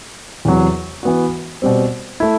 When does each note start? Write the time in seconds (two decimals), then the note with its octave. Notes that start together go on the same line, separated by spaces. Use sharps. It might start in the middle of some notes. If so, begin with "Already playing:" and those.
0.45 E2 C3 F#3
1.03 E3 B3 F#4
1.62 B2 G3 C4
2.20 A3 E4